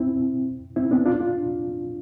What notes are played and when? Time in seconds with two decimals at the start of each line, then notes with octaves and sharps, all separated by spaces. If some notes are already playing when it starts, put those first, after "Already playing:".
Already playing: C4 E4
0.76 C4 E4
0.91 B3 D4
1.06 D4 F4
1.21 D4 F4